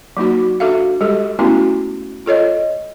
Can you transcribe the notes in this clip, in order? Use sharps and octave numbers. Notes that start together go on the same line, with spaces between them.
F#3 A#3 D#4 F#4
D4 F#4 A4 E5 F5
G3 G#3 G4 A4
A3 B3 C#4 E4 F#4 A#4
F4 A4 C#5 D#5